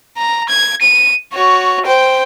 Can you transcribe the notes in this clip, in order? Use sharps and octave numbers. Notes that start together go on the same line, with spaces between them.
A#5
G#6
D#7
F#4 C#5
C5 G5